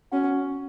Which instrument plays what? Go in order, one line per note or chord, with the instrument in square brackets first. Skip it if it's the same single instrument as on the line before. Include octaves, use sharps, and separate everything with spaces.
[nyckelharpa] C#4 [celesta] F#4 F#5